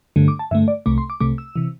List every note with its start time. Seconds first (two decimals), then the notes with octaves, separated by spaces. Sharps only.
0.16 G2 D3 A3
0.28 D6
0.39 A5
0.51 G2 D3 A3 E5
0.68 D5
0.86 C2 C3 A3 D6
0.98 C6
1.10 D6
1.20 C2 C3 A3 D6
1.38 E6
1.56 C3 E3